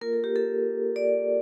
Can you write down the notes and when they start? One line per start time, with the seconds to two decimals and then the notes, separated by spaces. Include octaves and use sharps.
0.01 A#3 F4 A#4
0.13 A4
0.24 G4
0.36 A4
0.96 D5